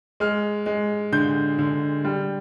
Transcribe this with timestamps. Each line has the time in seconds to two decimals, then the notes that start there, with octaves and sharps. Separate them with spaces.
0.20 G#3 F6
0.66 G#3
1.12 D3 G6
1.59 D3
2.04 G3